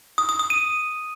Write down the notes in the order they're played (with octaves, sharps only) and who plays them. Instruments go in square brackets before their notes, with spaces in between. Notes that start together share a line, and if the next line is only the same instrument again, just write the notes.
[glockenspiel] D#6
D#6
D#6
D#7